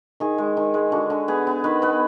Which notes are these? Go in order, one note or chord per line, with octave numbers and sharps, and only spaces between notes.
D#3 G#4
G#3
D#3
G#3
D3 F#4
D3
B3 G#4
B3
D#3 B4
B3 B4